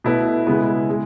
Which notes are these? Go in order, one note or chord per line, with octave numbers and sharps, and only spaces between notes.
B2 A3 E4 B4
C#3 G#3 B3 E4
G#3